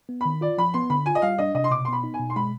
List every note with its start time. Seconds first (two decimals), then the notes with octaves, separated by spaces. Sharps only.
0.09 B3
0.21 D#3 B5
0.41 F4 D5
0.58 F3 B5
0.74 B3 C6
0.90 D3 B5
1.06 F4 G#5
1.15 D#5
1.22 G3 F5
1.38 D4 D#5
1.55 C3 D#5
1.64 C6
1.71 B2 D6
1.85 C6
1.88 B3 B5
2.04 D#4
2.14 G#5
2.19 B2
2.30 C6
2.36 G#3 B5